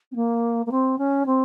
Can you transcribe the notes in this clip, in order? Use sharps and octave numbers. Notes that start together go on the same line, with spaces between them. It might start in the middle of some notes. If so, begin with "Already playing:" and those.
C4
A#3
A#3
C4
C#4
C4